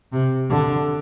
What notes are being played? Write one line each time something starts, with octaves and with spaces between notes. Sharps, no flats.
C3
D3